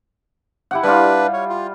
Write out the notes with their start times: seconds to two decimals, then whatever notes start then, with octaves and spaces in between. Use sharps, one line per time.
0.71 E4 G4 F#5
0.83 G3 D4 F4 B4
1.33 C#5
1.50 F4